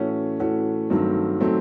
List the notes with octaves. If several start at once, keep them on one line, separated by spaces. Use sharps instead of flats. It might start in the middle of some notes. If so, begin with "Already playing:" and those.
Already playing: A2 E3 A3 C#4 F#4
A2 E3 A3 C#4 F#4
G2 D#3 F#3 A3 C4
D#3 F#3 A3 C4